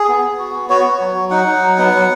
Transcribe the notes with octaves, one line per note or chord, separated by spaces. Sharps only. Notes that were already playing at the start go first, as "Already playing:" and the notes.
Already playing: G#4
B3
B3
F#4
B3
F#4 C#5
B3
F#3
F#3
D#4 F#5
D#4
F#3
B3
F#3